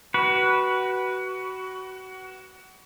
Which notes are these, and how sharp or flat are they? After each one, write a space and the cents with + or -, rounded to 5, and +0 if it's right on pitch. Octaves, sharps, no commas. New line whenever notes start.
F#4 +25 B4 -10